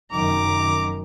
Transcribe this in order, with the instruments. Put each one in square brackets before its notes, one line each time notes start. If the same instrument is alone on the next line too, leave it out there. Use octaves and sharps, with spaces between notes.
[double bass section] F1 F#2 D#3 [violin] A#5 [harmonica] D6